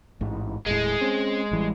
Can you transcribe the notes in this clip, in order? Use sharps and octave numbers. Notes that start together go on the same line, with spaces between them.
A1 G#2
D#1 A2 G#3
C4 C#4
A1 E3 G3